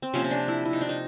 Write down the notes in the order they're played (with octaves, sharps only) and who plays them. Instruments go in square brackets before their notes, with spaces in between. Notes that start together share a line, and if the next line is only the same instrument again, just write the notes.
[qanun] C4
C3 F3 A#3 C#4
C#4
D4
E4
E4
D#4
D4
D#4